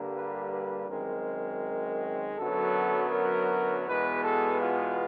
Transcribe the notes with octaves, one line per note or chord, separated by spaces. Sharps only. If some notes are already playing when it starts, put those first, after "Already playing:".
Already playing: G2 D3 G3 A#3
B4
B4
F#2 D#3 G#3 C4 A#4
F#2 D3 F#3 B3 A4
A#4
E2 B2 G#3 B3 B4
A4
F4